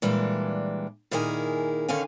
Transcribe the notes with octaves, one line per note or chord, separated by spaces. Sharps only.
A#2 E3 G3 G#3 D4
A#2 D#3 E4 G#4 A#4 G#5
D3 D#3 C#4 F5 G#5